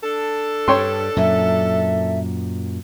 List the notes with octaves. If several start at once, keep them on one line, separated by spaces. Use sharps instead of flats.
D4 A4
G2 C#5 G5 C6
F#2 A#2 F#3 E5